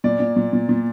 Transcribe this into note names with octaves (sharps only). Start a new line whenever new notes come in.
A#2 D5
A#2
A#2
A#2
A#2